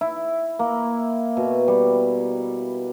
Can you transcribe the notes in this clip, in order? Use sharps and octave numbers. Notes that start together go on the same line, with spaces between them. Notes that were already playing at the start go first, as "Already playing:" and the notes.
E4
A#3
B2
G3